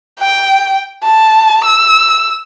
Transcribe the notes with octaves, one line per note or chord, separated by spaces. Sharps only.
G5
A5
E6